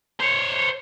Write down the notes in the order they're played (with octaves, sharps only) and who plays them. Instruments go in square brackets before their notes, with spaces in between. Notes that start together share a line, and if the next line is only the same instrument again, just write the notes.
[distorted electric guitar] C5 C#5